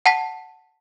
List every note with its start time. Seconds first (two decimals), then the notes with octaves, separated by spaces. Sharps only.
0.06 F#5 A5 B6